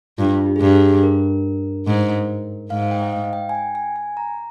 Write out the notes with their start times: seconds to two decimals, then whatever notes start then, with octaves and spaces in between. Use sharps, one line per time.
0.18 G2 F4
0.46 G4
0.56 G#4
0.60 G2 G4
0.75 G#4
1.03 A#4
1.87 G#2
2.70 G#2 F5
2.91 G5
3.02 D#5
3.13 F5
3.33 G5
3.49 G#5
3.55 G5
3.75 G#5
3.96 G#5
4.17 A#5